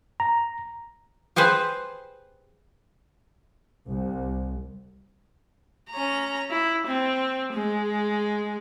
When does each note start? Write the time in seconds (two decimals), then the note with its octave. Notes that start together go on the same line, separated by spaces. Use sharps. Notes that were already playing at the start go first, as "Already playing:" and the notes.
0.20 A#5
1.36 G4 G#4 B4 C5
3.86 C2
5.90 C#4 A#5
6.50 E4
6.87 C4
7.54 G#3